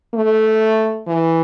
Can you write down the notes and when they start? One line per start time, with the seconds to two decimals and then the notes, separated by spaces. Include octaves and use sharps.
0.14 A3
1.07 E3